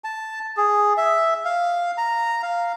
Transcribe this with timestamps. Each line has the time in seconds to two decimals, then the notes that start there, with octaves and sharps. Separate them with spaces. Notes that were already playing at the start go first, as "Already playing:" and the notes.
0.04 A5
0.57 G#4
0.97 E5
1.45 F5
1.98 A#5
2.43 F5